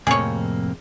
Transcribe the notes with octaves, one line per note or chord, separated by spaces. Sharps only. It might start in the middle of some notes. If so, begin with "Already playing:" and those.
F2 A2 C3 F3 A3 A#3 G#4 C#5